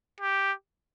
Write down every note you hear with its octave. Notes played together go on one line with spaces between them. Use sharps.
G4